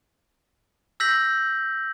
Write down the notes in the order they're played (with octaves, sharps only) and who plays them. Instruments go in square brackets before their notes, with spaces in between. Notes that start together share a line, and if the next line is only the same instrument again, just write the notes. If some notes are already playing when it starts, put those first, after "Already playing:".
[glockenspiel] E6 G6 A#6 B6 F#7